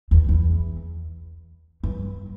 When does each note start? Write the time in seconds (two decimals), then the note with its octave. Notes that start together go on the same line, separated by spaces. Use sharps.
0.11 E2
0.29 E2
1.84 G2